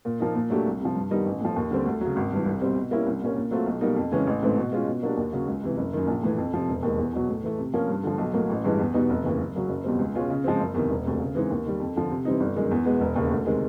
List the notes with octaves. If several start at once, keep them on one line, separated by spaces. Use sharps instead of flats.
A#2
F3 A#3 D#4
A#2
F#3 A3 D4 G4
C2
C3 F3
G2
D#3 G3 B3 D#4
A1
A2 F3
D#2
D3 G3 C4
D2
C#3 F#3
G#1
G2 E3
C2
B2 G3 C4
B2
G3 A#3 C#4 E4
C2
A#2 G3 A#3 C#4
A#2
F#3 A3 C4 F4
B1
B2 G3 A#3 D#4
F2
C#3 E3 G#3 C#4
A1
G#2 E3 A3 C4
B2
G#3 C#4 F4
B2
F#3 A#3 D4 G4
D#2
C#3 F#3
C#2
C3 E3
F#1
F#2 D#3
A#1
A2 E3
F2
C3 F3
E1
D#2 D#3 G#3
E2
B2 F#3
A2
E3 A3
C3
F3 A#3 C#4
G2
D3 F3
B1
A2 F#3 A#3
A1
G2 E3 G#3
E2
B2 G3 B3 D#4
F1
D#2 C#3 E3
F#1
F#2 C#3 F#3
F#1
E2 B2 G3 C4
C#2
B2 G#3 C#4 F4
C#3
F3 G#3 C4
F#1
E2 C3 D#3
E1
D2 C3
C#3
E3 G#3 C4 D#4
D#2
D#3 G3
F2
D3 F3
C3
E3 G3 C4 D#4
G1
F#2 D#3 G#3
E2
B2 G#3 B3
E1
D#2 C#3
D2
C3 D#3 G#3 C4